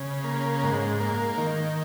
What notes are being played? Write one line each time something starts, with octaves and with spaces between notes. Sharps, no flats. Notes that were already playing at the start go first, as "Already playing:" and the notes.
Already playing: C#3
A#3
G#2
A#3
D#3